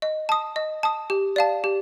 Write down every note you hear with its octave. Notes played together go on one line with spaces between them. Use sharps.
D#5
A5 D#6
D#5
A5 D#6
G4
D5 F5 A5
G4